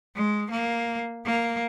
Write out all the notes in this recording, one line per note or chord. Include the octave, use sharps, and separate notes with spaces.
G#3
A#3
A#3